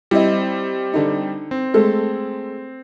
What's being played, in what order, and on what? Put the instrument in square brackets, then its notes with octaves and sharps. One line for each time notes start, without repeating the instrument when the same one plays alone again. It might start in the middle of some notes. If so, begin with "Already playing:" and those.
[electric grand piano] G3 C4 [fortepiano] E4 D#5
[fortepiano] D3 D#4
[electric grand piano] C4
[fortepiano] G#3 A3 A4